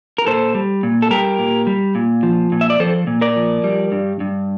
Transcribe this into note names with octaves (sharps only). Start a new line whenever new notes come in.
A#4
A#2 A4 C5
G3
A#2
A4
G3 G4 A#4
A#2
G3
A#2
F3
A#2
E5
D5
F3 A4 C5
A#2
A#4 D5
F3
G3
G2
G2